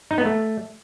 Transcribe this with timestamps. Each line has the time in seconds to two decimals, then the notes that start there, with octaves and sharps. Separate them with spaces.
0.11 D#4
0.18 B3
0.25 A3